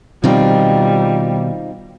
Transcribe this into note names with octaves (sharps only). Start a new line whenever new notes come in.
B2 D#3 F3 G3 C4 D#4 F4